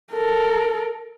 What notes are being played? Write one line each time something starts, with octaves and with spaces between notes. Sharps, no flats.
A4 A#4